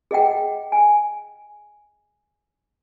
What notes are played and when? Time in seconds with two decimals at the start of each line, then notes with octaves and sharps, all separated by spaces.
0.11 G#4 D#5 F#5 G5
0.72 G#5